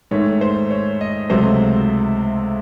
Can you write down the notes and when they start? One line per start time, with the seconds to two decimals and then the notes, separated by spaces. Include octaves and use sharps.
0.11 G#2 D#3 A3 C#5
0.41 C5
0.71 C#5
1.01 D#5
1.29 C#2 C3 F#3 A3 C5